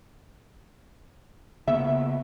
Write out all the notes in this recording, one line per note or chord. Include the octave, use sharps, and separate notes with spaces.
C#3 A#3 B3 E5